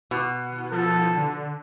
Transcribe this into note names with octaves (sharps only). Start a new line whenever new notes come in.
B2
F3 A4
D3